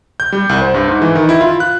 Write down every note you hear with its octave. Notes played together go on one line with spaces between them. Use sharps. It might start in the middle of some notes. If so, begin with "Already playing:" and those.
G6
G3
C2
C5
G2
G#2
E3
D#3
E4
F4
F#6